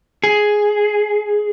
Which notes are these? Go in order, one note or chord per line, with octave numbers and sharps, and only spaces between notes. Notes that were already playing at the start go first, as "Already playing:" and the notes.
G#4